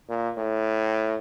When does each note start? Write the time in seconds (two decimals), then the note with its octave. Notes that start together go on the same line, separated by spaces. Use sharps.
0.09 A#2
0.37 A2